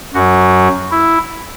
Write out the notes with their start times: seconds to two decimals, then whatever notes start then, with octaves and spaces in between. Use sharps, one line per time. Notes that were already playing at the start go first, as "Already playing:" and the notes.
0.14 F#2 F#3 F#4
0.91 E4